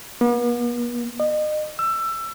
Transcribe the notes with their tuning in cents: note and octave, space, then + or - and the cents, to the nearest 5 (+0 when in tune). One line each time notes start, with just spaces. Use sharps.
B3 -45
D#5 -35
E6 +20